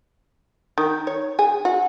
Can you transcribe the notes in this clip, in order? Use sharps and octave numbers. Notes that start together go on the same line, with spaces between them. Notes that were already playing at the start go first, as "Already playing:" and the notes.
D#3
C#5
G#4
F#4